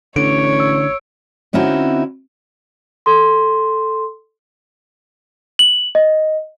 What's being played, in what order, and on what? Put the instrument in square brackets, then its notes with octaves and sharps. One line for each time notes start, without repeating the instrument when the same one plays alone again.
[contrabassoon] A1 [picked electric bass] D3 [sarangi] C#5 [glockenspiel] D7
[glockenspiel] E6
[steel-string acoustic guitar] D3 C4 C#4 D#4 E4 F#4
[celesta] A4 C6
F#7
D#5